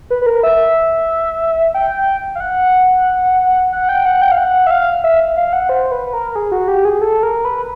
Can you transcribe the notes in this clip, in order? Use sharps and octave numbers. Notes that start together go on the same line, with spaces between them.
B4
B4
A#4
E5
G5
G5
F5
F#5
F#5
G5
F#5
G5
F5
F#5
E5
F5
E5
F5
F#5
C5
B4
B4
A#4
G#4
F#4
G4
G#4
A4
A#4
B4